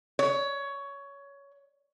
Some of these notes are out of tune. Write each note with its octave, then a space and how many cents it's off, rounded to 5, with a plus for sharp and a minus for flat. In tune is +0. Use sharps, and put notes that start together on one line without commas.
C#5 +15